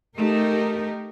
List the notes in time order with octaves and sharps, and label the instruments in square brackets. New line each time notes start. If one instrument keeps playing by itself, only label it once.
[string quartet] A3 [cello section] D#4 G4 A#4